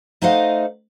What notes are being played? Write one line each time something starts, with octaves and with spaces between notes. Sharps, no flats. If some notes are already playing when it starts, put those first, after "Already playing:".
A3 D#4 C5 D#5 F5 F#5